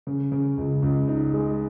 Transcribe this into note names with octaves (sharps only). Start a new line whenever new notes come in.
C#3
C#3
C#2
C#2
D#4
G#3